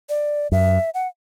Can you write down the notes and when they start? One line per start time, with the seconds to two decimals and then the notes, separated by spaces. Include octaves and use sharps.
0.09 D5
0.52 F#2 E5
0.94 F#5